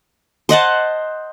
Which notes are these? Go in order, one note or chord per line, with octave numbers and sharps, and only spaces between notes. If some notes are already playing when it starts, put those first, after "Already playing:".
C5 D#5 F#5 A5